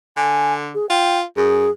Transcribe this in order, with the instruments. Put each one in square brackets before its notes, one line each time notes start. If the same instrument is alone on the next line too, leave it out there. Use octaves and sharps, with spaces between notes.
[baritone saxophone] D3 [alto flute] G#5
[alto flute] G#4
[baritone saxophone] F4 [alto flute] G5
[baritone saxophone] F#2 [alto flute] G#4